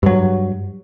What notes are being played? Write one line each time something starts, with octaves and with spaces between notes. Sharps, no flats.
G2 F#3